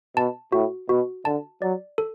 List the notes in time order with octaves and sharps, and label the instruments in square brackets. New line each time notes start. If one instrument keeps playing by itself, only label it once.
[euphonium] B2 [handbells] A5
[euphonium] A2 [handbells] F#4
[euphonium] B2 [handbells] F#4
[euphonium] D3 [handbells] A5
[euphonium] F#3 [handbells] D5
[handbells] A4